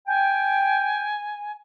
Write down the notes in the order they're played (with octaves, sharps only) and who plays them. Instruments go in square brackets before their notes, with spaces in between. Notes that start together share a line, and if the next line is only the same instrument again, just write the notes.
[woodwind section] G5 [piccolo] G#5